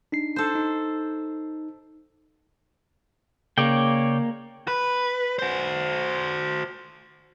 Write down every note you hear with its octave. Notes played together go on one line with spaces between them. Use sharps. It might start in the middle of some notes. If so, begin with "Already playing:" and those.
D4 D#4 C7
A4 C5
D#4
C#3 A#3 C#5 D5 G5
B4
F#4 C5